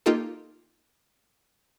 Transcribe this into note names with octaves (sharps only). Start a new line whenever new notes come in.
A#3 D#4 F4 G4 A4